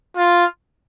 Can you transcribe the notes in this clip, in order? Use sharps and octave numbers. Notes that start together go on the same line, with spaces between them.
F4